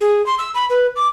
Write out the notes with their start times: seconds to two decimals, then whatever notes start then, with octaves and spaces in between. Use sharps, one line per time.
0.01 G#4
0.26 C6
0.39 E6
0.54 B5
0.70 B4
0.96 D6